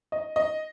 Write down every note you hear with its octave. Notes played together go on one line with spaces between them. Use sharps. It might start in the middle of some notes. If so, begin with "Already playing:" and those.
D#5
D#5